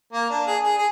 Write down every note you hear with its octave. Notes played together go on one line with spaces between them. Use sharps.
A#3
D4
G#4
G#4
G#4